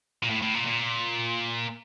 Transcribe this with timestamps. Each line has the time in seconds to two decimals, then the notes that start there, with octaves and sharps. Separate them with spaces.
0.23 A#2
0.30 A2
0.42 A2
0.54 A#2
0.66 A#2